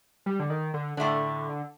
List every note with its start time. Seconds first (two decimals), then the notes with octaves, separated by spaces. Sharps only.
0.26 G3
0.40 D3
0.50 D#3
0.74 D3
0.97 A2 D3 A3 D4